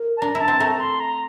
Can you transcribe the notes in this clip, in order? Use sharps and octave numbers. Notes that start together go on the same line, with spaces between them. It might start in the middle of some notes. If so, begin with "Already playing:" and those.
Already playing: A#3
A5
D4 A#5
E4
A5
C4
A3 A#5
C6
A#5